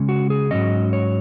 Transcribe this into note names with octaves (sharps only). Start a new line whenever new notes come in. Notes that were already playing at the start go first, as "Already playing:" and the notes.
Already playing: C#3 G#3 C#4
F#4
G#4
G#2 F#3 C#4 D#5
C#5